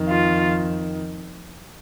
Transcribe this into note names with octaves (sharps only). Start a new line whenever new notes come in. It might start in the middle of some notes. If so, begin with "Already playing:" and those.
Already playing: F2 D#3
F4